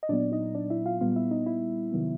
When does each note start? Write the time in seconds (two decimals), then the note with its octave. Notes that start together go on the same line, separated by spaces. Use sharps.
0.03 D#5
0.09 A#2 F#3 B3 D4 D5
0.32 D#4 D#5
0.55 D4 D5
0.70 E4 E5
0.85 F4 F5
1.01 A#2 G3 B3 F4 F5
1.12 F5
1.16 E4 E5
1.31 D#4 D#5
1.46 E4 E5
1.92 C3 D#3 F#3 B3